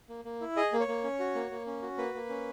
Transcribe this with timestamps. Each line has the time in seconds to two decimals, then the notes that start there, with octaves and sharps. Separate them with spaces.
0.09 A#3
0.25 A#3
0.41 E4
0.56 G#4 D#5
0.73 A#3
0.80 C#5
0.88 A#3
1.04 C#4
1.19 F#4
1.35 A#3
1.51 A#3
1.66 C#4
1.82 F#4
1.98 A#3 B4
2.14 A#3
2.29 C#4